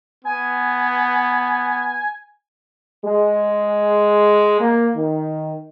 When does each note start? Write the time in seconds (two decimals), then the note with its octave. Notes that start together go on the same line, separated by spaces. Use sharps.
0.25 B3 G#5
3.05 G#3
4.61 A#3
4.95 D#3